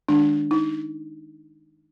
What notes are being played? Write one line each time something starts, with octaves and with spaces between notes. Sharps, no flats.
D#3 G#3 D4
D#4